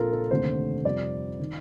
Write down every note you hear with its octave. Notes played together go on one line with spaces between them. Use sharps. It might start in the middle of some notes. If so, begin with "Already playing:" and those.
Already playing: A#1 A#2 F3 C4 F4 A4 A#4
A4
F1 D#2 D3 A3 C4 C5
F2 C3 G3 D5
D#3